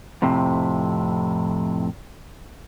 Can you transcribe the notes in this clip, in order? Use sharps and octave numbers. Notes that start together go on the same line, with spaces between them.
F2 A2 C3